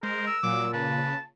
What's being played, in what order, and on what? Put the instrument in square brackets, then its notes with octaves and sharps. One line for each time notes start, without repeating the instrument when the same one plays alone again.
[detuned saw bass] G#3 [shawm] A#4 [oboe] C5
[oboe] E6
[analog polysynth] A#2 [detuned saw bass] F#3 [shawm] D6
[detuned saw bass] C#3 [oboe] B4 [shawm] A5